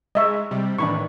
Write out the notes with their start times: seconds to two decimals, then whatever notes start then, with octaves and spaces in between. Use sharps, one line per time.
0.15 G#3 D#5 E5 C#6
0.51 C3 G3
0.78 A2 D#3 E3 D4 B5 C#6